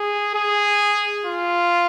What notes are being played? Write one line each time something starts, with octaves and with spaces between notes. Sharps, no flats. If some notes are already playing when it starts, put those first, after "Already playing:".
Already playing: G#4
G#4
F4